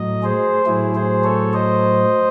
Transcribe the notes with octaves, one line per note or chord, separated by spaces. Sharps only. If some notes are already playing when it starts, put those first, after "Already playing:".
Already playing: A2 F#3 D#5
G#4 C5
A2 F#3 E4 G#4
G#4 C5
A4 C#5
C5 D#5